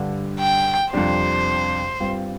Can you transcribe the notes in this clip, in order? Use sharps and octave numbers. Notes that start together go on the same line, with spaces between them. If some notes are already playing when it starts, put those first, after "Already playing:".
Already playing: G2 D3 G3 D4
G5
F2 C3 G3 D4 G4 C5
G2 G3 C4 F4